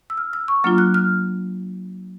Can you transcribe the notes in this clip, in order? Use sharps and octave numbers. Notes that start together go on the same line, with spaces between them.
E6
F6
E6
C#6
F#3 A#3 D4 F4 F6
F#6
F6